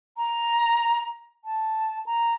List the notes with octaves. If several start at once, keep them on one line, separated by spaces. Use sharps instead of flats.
A#5
A5
A#5